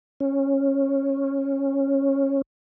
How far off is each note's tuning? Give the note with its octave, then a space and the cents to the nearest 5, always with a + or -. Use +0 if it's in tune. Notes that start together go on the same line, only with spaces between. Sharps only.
C#4 -15